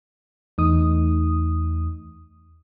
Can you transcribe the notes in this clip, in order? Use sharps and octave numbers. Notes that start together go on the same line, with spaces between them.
E2 A3 D#4 D#6